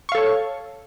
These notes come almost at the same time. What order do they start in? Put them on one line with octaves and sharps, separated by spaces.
C#6 F5 A4 C#5